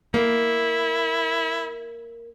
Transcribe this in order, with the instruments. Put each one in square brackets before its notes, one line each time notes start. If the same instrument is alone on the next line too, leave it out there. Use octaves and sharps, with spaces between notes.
[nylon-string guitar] A#3 [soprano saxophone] E4